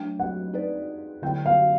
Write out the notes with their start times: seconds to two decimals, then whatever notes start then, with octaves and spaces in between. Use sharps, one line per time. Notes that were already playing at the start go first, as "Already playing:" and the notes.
Already playing: F#3 A3 D4 G5
0.20 F#5
0.53 C4 D#4 G#4 B4 D5
1.22 D3 F#3 A3 C4 E4 G5
1.46 F5